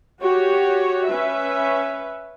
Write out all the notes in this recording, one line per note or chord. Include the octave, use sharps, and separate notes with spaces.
F#4 G4 C#5
C#4 B4 E5